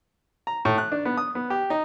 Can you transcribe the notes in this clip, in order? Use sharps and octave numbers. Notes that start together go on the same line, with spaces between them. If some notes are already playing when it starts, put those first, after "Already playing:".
A#5
A2
F#6
D4
B3
D#6
B3
G4
D#4